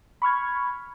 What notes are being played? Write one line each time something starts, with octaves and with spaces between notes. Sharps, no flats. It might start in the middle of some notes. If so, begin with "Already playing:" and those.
B5 C#6 F6 G#6